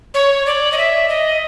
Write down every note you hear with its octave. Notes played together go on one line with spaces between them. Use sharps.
C#5
D5
D#5
E5
D#5